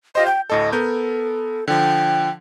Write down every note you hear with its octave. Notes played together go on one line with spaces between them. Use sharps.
F4 G4 C5 D#5
G5 G6
D2 A2 A4 D#5
B3 A4 A#4 G6
D3 F3 G5